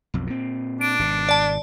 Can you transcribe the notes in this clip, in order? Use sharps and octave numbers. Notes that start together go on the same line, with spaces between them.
B1 F2
A#2 C4
D4 D7
G#1 B2
D5 A5